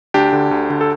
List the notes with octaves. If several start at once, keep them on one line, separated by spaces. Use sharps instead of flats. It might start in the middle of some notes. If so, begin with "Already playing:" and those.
D2 D4 G4
D3
D2
D3
A4